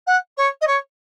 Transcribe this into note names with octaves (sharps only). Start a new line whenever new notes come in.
F#5
C#5
D#5
C#5